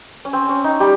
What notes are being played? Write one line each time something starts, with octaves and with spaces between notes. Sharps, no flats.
C#4
C4
C#4
D#4
G3 G4